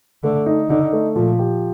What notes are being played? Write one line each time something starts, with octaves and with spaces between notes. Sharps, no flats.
D3 A3
D#4
D3 D#4
A3
A#2 F3
G4